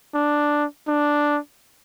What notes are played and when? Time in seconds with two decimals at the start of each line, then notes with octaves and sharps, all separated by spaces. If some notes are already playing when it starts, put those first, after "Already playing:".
0.15 D4
0.88 D4